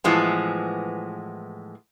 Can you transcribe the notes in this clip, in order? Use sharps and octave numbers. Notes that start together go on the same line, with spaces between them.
A2 E3 F3 G#3 B3